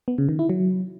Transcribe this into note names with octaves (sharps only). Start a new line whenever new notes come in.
B3
C#3
D#3
E4
F#3